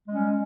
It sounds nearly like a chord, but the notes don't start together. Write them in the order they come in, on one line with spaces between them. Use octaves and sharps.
G#3 G3 C#4